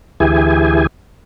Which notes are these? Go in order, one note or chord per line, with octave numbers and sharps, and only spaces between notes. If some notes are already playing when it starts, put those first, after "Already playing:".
D2 E3 E4 G4 G#4 G#5